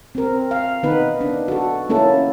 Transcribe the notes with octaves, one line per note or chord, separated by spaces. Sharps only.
C4 A#4
F5
D#3 B3 D#4 B4
D4
F#4 A4
A#3 C#4 E4 A4